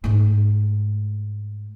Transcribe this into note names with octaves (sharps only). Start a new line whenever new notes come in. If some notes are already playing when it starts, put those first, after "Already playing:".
G#2 A3